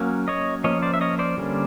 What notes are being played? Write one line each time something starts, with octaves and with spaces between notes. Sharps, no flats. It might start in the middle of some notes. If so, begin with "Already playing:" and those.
Already playing: F#3 A#3 C#4
C#5 D#5
F3 A#3 C#4 C#5 D#5
C5 D5
E5
C#5 D#5
C5 D5
D3 G3 A#3 C#4